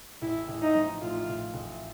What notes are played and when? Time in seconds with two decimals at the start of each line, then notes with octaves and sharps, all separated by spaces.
0.21 A1 E4
0.48 A1
0.62 D#4
0.75 F3
1.01 A2 F4
1.28 A1
1.54 A1